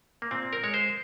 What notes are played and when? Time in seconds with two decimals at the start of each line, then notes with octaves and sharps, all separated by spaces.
0.22 A#3
0.31 A#2 C4
0.53 A#4
0.63 G#3 C#5
0.74 C5